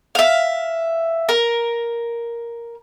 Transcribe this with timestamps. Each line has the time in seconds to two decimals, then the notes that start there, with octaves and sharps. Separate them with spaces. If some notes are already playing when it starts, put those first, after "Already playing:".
0.15 E5 F5
1.29 A#4